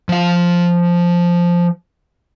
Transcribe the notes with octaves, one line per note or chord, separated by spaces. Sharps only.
F3 F5